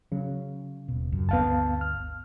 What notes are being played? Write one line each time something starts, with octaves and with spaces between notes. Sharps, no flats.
C#3 F#3
D#1 B2
C#2 F#2
G1 D2 B3 F5 A5
F6